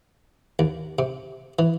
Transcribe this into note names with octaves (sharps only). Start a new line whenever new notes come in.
D#2
C3
E3